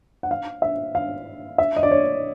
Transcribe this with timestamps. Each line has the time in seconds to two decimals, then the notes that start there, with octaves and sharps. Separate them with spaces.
0.23 F#5
0.31 F5
0.62 E5
0.95 F5
1.58 E5
1.76 D#5
1.83 D5
1.91 C#5